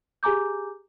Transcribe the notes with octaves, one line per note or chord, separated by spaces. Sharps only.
G4 G#4 G#5 A#5 D6 G6